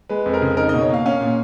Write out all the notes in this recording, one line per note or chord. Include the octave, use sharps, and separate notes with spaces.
G#3 B4
F2
A#4
C#3
D#4 A#4
B2 D#5
C#5
A#3 F5
C#4 F5
A#2